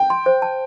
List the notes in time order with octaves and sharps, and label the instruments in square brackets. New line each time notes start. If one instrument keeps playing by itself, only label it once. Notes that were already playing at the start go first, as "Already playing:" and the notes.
Already playing: [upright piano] G5
[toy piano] C6
C5
A5